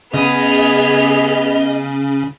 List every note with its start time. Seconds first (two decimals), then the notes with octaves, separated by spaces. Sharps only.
0.14 C#3 B3 G#4 D#5 F7